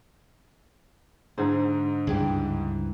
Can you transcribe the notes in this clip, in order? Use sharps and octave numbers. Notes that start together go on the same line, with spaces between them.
G#2 D3 D#4 G#4 C5
C#2 G2 E3 G4 G#4